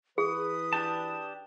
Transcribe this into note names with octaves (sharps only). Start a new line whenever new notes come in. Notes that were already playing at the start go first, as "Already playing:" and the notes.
E3 G#4 B4 D#6
D4 G4 A5